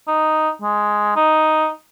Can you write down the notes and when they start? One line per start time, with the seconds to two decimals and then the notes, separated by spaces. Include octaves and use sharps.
0.08 D#4
0.62 G#3
1.16 D#4